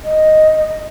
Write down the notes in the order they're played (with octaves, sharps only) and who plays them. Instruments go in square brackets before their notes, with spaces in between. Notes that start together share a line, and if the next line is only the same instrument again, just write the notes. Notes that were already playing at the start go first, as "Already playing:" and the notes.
[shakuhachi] D#5